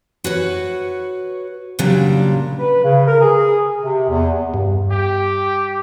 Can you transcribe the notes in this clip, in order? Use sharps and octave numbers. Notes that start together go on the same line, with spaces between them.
F#4 B4 C#5
A#2 C#3 F#3 G3 D4
B4
C#3
A#4
G#4
C3
E2
G2
G4